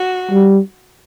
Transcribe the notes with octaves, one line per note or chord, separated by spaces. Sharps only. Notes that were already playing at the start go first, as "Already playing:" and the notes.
Already playing: F#4
G3